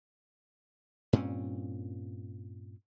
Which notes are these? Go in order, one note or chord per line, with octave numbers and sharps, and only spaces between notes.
G2 A#2 C4 C#4